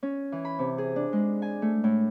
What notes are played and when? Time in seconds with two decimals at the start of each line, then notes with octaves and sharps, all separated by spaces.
0.03 C#4
0.32 E3
0.45 B5
0.59 C3
0.78 G#4
0.96 D4
1.13 G#3
1.42 G#5
1.62 A3
1.84 A2